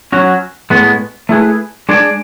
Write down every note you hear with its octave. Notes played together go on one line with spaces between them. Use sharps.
F#3 C#4 F#4
A2 G#3 B3
A3 E4 G#4 B4
G#3 D4 G#4 D5